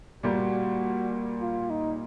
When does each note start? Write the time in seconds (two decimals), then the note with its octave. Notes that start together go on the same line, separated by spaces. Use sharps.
0.23 A#2 G3 A#3 F#4
1.41 F4
1.70 D#4